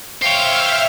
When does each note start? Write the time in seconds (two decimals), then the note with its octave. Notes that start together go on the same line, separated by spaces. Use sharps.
0.22 C5 C#5 E5 F5 G5 F6